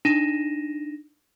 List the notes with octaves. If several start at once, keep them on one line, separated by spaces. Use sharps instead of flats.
D4 D#4 A#6 D#7 E7